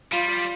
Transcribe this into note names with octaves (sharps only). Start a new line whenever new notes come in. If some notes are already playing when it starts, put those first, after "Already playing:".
G3 F4